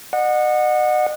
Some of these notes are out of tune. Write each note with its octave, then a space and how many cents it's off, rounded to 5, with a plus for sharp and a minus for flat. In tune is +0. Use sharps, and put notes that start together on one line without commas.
D#5 -40 F#5 -15